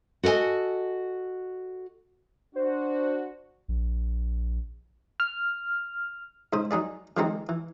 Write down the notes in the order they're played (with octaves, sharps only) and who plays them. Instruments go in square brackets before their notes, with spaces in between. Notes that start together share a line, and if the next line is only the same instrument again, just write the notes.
[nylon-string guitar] F#4 A4 A#4 D#5 G#5
[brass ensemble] D4 F#4 [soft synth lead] C5
[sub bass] A#1
[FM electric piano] F6
[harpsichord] G#2 C#3 C5 D#6
F#3 D#4 G#4 D5
D3 E3 F#3 G#3 C4 D#4
E3